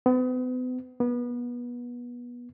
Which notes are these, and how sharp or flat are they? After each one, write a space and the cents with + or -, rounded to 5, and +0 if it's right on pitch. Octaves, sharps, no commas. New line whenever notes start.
B3 +40
B3 -25